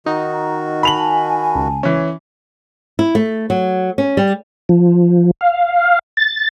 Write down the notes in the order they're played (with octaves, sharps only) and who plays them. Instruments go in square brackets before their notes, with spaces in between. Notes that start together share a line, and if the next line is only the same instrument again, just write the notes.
[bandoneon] D#3 F#4 [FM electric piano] D#4
[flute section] A#5
[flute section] G#5 A5 [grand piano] B5 F7 F#7
[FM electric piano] C#2
[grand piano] E3 C#4
[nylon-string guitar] E4
A3
F#3
C#4
G3
[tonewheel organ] F3
F5
A6